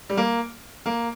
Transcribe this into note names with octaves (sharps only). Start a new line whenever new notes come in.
G3
A#3
A#3